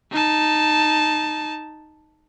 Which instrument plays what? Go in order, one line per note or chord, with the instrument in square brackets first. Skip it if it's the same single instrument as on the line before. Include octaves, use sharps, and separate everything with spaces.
[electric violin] D#4 A5